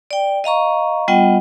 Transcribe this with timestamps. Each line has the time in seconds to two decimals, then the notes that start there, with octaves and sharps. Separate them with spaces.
0.11 D5 G5
0.44 D#5 F5 A#5 C#6
1.08 G3 B3 F4 D#5 F#5 G5